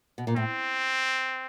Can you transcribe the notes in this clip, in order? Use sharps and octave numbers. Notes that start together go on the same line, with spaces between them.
B2
A#2
A2 C4